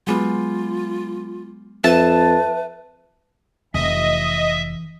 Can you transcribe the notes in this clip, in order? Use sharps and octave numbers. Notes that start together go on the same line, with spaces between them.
F#3 G#3 B3 F4
F2 B4 E5 A5
F1 E3 D#5 E5